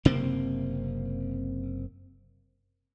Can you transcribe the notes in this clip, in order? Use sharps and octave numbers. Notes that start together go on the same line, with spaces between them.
F#1 C3 A#3 C4